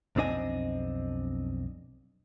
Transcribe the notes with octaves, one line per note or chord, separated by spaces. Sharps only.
B1 F2 C4 D4 D#5 G#5